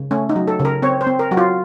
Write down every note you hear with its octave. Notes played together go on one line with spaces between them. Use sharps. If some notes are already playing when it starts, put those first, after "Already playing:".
Already playing: C#3
A3 C#4
D#4
F#3
A4
C#3
A#4
C4 C#5
C5
C4
A#4
F#3 F#4
F4